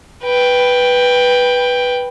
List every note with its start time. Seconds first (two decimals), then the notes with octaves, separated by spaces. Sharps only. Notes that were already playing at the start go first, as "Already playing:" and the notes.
0.25 B4 G5